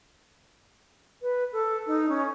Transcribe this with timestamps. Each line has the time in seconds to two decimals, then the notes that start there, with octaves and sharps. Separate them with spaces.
1.22 B4
1.52 A4
1.87 D#4
2.09 C#4